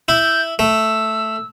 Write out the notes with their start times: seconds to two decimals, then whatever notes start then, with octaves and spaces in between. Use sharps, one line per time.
0.08 E4 G6
0.59 A3 E6